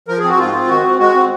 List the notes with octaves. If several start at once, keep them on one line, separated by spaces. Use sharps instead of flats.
F3 A#4
G#4
C4 F#4
G#2 F4
C4
D#3 F#4
C4
G#3 F#4
C4